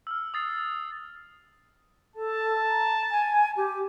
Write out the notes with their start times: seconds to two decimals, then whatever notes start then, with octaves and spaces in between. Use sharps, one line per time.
0.07 E6 F6
0.34 D#6 A6 C7
2.16 A4 A5
2.68 A#5
3.11 G#5
3.57 G4